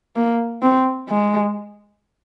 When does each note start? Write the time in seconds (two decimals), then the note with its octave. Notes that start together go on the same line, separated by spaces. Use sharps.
0.16 A#3
0.62 C4
1.09 G#3